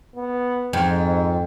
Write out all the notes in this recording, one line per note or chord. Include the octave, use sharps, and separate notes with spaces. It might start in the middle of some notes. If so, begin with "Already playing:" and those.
B3
F2 G#2